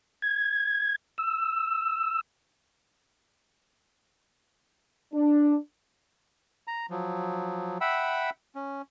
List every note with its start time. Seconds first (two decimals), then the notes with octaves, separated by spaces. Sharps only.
0.22 G#6
1.18 E6
5.14 D4
6.67 A#5
6.90 F3 F#3
7.81 E5 F#5 G5 B5 E6
8.55 C#4